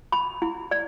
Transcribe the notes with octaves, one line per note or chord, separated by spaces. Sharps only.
B5
E4
D5